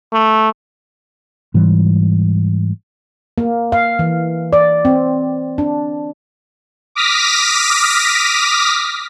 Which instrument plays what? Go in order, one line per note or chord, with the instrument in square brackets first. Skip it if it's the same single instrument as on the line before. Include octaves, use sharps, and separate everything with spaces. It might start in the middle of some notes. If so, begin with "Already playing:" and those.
[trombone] A3
[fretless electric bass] G#2 E3 G3
[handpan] A#3
F5
E3
D5
C4
D4
[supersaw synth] D6 D#6 F6 A#6 B6